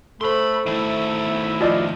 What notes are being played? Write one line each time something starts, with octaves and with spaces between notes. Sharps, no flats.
A3 A4 C5 B5 C6
D#3 A3 E4
F3 D5 D#5